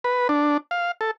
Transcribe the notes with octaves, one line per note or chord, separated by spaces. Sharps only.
B4
D4
F5
A4